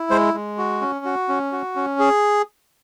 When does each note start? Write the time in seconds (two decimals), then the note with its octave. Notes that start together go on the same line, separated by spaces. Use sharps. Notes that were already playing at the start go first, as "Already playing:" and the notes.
Already playing: E4
0.10 G#3 C5
0.34 G#3
0.58 F#4
0.81 C#4
1.05 F#4
1.29 C#4
1.52 F#4
1.76 C#4
1.99 G#4